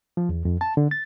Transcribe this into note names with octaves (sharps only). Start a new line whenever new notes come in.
F3
E2
F2
A5
D3
A6